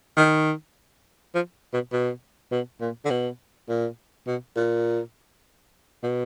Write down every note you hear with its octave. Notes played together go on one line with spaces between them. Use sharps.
D#3
F3
B2
B2
B2
A#2
D3
B2
A#2
B2
A#2
B2